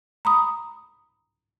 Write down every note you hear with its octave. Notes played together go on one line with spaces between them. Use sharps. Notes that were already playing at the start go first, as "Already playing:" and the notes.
A#5 B5 D#6